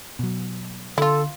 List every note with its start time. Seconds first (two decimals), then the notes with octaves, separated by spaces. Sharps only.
0.19 B2 F#3
0.98 D3 E4 F4 A4